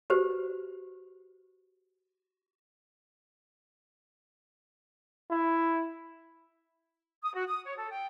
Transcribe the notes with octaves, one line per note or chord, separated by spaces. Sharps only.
F#4 G4 B4 C5
E4
D#6
F#4
D#6
C#5
A4
G5